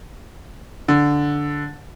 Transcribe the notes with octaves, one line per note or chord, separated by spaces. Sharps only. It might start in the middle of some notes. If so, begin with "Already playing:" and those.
D3